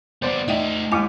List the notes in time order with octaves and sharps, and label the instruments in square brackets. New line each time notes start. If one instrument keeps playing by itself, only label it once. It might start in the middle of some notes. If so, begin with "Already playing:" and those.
[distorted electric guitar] G3 B3 [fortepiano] C5 D5 C6
[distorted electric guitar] A3 C5 [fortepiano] D#4 [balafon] D5 E5 G5
[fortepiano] D#2 D6 [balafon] G#3 E4 G#5